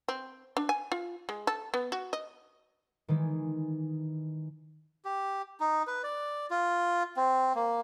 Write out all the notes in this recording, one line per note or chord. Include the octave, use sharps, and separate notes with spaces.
C4
D4
G#5
F4
G#3
A4
B3
F#4
D#5
D#3 E3 G#3
G4
D#4
B4
D5
F4
C4
A#3